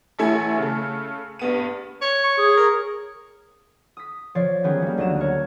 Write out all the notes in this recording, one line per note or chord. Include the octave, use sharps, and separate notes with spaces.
A1 A3 E4 G#5
C#3 A3
G2 B3 D#7
C#5
C#6
G#4
A#4
D#6 B6
F3 C#5 D5 C7
D#3 F#3 B3 C#4 G4 G#4
G3 A#3
D2 F#3 D#5 E7
A#4 C#5